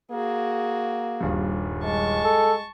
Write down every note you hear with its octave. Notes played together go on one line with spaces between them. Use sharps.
A#3 F#4 G#4
D#1 G2
G#3 A5 C#6
A4